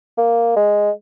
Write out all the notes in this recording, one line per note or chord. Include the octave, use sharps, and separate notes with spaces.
A#3
G#3